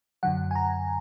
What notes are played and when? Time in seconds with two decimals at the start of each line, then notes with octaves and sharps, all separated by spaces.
0.23 F#2 D3 F#3 F#5
0.51 G#5
0.55 A#5